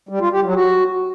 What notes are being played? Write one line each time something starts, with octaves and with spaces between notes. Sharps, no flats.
G3
F4
G4
F#3
F#4